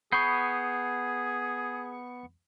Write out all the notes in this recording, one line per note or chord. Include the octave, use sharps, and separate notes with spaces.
B3 G#4 B5 C#6 G6 C7